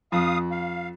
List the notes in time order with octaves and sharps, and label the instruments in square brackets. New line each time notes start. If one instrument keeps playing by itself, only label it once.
[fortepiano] F2 [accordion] F5 D#6
[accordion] F5